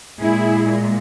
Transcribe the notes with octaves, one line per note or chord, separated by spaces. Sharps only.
A#2 G#3 E4 G#4